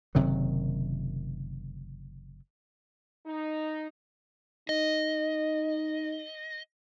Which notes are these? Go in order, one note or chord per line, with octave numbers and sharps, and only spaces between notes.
F#1 C3 D#3 F#3
D#4
D#4 D#5